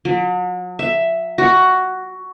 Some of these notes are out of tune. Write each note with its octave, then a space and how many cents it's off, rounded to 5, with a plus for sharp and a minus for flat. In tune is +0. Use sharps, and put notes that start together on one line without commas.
F#3 -40
E5 +5
F#4 +10